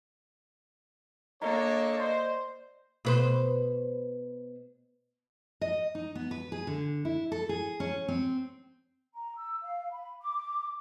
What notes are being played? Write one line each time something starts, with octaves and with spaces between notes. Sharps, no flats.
A#3 D4 A4 C#5 D#5 A#5
C5 D5 C6
B2 B4 C5
D#5
D#4
B3
B4
G#4
D3
E4
A4
G#4
C#4
C4
A#5
E6
F5
B5
D6